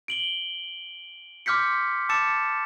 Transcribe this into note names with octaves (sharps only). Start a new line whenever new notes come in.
D7 F#7 G7
C6 D6 F6 G6 B6 C#7
A5 D6 E6 A6 C#7 E7